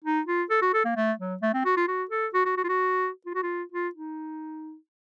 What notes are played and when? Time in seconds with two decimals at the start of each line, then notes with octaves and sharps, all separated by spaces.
0.04 D#4
0.27 F4
0.50 A4
0.62 F#4
0.74 A4
0.85 A#3
0.97 A3
1.19 F#3
1.42 A3
1.54 C4
1.65 F#4
1.77 F4
1.88 F#4
2.11 A4
2.34 F#4
2.46 F#4
2.57 F#4
2.64 F4
2.69 F#4
3.26 F4
3.34 F#4
3.43 F4
3.72 F4
3.95 D#4